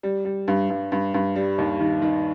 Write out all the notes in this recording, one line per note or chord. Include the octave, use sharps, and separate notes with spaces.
G3
G3
G2
G2
G2
G2
G3
D#2
D#3
D#3